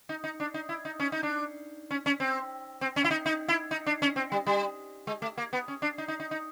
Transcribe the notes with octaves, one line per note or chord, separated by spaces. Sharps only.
D#4
D#4
D4
D#4
E4
D#4
C#4
D#4
D4
C#4
C#4
C4
C4
C#4
E4
D#4
D#4
E4
D#4
D4
C#4
C4
G3
G3
G#3
A3
A#3
B3
C#4
D4
D#4
D#4
D#4
D#4